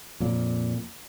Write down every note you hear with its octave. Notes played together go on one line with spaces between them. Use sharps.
F2 A#2